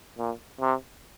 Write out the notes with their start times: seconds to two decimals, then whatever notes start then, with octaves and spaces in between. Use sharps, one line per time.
0.18 A#2
0.61 C3